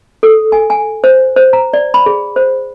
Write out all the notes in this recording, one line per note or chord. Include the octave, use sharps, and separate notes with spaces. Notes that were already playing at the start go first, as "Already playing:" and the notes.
A4
G#5
G#5
C5
C5
A#5
D5
B5
G#4
C5